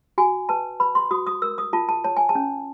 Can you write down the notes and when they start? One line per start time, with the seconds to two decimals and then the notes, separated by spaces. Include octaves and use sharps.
0.18 F#4 G#5
0.49 B4 A5
0.80 B4 B5
0.95 C6
1.11 F#4 D#6
1.27 D#6
1.42 A#4 E6
1.58 D#6
1.73 F4 A5
1.89 A5
2.04 C#5 A5
2.17 G#5
2.29 A5
2.35 C#4